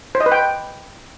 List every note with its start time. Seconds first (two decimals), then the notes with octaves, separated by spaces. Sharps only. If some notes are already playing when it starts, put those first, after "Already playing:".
0.15 C5
0.20 D#5
0.26 B4
0.32 G5